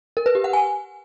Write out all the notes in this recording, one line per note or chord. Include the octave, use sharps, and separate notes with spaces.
A#4
B4
G4
F#5
G#5